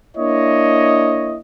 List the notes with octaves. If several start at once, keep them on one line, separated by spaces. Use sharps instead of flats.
A#3 D4 E4 C#5 D#5